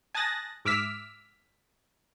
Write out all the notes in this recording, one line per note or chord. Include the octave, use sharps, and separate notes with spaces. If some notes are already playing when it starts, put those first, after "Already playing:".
G#5 A5 D#6 F#6 A6 A#6
G#2 E5 D6 E6 F6 B6